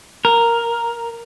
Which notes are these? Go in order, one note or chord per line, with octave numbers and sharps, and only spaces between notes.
A#4